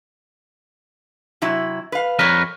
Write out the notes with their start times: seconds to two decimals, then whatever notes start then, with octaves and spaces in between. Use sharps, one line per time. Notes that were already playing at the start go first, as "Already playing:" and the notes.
1.42 C3 F#3 E4
1.92 B4 F5
2.19 F2 G3 A#4 B4 C#5